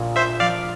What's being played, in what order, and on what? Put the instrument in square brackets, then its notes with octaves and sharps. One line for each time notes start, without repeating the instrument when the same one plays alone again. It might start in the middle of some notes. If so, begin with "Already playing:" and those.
Already playing: [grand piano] A#1 A#2
[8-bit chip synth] C5 E5
[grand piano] F3 [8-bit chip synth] D5 F5